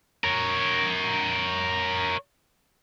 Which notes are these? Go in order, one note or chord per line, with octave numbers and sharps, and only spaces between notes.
A#4 C#5